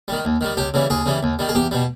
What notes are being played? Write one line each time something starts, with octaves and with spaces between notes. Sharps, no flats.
D#3 G3
D#2
D#3 G3
C#2 G4
C#3 E3 G3
D#2 G#4
C#3 E3 G3
D#2
D#3 G3
G#4
E2 G4
B2 G3